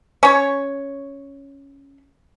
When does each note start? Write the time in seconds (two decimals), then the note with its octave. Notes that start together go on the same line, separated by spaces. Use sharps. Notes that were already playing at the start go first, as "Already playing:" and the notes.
0.23 C#4 C#5